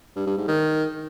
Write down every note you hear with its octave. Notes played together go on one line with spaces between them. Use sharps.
G2
G2
G#2
D#3